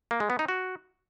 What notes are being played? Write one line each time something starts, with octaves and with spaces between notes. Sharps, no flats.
A#3
G#3
B3
D#4
F#4